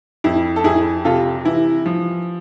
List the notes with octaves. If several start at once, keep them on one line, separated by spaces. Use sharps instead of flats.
F2 E4
A4
F2 E4 G#4
C3 F4 A4
E3 E4
F3